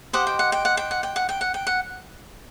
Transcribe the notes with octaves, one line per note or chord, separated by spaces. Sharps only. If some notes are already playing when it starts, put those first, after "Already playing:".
G4 C5 D#5 F#5
G5
F#5
G5
F#5
G5
F#5
G5
F#5
G5
F#5
G5
F#5